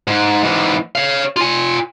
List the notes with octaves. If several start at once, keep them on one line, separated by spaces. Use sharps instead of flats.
G#2
G#2 E3
C#5 F5
F4 G#5